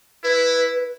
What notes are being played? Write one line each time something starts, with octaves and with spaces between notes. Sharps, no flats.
E4 B4